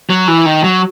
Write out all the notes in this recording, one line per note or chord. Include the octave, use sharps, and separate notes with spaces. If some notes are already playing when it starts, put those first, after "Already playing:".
F#3
E3
D#3
F#3